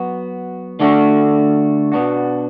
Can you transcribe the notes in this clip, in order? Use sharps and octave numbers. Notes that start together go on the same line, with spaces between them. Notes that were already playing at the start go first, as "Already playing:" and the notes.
Already playing: F#3 B3 F#4
D3 A3 D4 F#4
B2 B3 D4 F#4